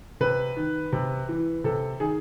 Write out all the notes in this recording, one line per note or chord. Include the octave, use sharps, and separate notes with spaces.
C3 B4
D#3
C3
E3
C3 A4
D#3 G#4